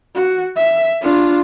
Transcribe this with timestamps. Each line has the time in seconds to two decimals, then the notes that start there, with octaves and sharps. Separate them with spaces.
0.15 F#4
0.56 E5
1.02 D4 F4